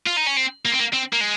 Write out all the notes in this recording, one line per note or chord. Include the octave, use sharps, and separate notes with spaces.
F4
D#4
C#4
C4
A#3
C4
A#3
C4
A#3
G#3